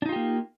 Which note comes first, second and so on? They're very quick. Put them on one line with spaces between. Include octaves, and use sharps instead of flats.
D4 D#4 F4 G4 A#3